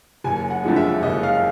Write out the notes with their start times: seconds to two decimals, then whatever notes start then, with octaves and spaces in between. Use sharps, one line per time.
0.24 F#1 G#5
0.50 F#5
0.63 F2 D3 F3 G#3
0.76 E5
1.03 F#1 D#5
1.23 F5